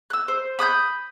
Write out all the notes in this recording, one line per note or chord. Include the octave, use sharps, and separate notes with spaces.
E6 F#6
C5
B5 D#6 F#6 G6